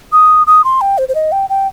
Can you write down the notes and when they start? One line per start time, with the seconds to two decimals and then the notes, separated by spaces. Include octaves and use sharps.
0.12 D#6
0.47 D#6
0.64 C6
0.81 G5
0.98 C5
1.08 C5
1.15 D#5
1.32 G5
1.49 G5